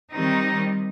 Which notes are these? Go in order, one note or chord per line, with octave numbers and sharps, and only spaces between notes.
D#3 G3 C4 D#4